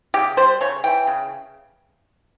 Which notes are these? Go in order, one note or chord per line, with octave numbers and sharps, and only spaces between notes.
C#3 G4
G3 C5
C#3 C#5
E3 G5
C#3